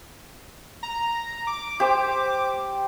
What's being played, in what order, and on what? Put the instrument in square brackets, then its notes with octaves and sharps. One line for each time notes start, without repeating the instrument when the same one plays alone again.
[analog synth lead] A#5
D6
[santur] G4 C5